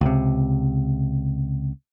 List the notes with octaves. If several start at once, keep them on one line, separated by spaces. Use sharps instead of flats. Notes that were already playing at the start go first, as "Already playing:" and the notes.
C#2 C3